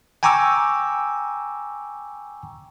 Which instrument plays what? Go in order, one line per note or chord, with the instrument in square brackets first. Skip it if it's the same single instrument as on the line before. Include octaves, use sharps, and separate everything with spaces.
[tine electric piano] G5 G#5 A#5 C#6 D6 E6